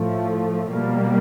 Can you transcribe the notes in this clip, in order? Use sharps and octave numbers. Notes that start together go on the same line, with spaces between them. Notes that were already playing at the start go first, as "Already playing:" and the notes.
Already playing: A2 F3 A3
B2 G3 A#3